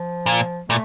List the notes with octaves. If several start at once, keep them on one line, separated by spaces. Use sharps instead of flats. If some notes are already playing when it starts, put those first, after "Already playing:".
Already playing: F3
A#2
A#2 A3